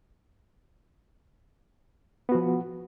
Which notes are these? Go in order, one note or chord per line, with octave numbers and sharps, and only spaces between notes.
F3 B3 F#4